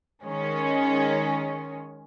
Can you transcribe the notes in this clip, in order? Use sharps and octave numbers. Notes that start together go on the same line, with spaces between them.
D#3 G#3 C#4